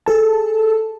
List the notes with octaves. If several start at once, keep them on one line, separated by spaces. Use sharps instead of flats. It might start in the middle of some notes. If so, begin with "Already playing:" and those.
G#4 A4 A5